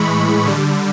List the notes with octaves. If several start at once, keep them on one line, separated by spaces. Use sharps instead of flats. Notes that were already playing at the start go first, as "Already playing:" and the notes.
Already playing: A2 E3 G#3 B5 C#6
D3 G3